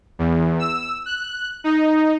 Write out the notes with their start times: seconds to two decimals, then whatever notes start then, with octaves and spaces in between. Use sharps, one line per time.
0.19 E2
0.59 E6
1.06 F#6
1.64 D#4